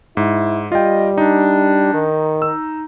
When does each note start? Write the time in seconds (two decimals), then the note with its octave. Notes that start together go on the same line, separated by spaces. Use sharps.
0.17 G#2 E4
0.72 G3 F4 D#5 G5
1.18 D4 D#4
1.94 D#3
2.42 D#4 E6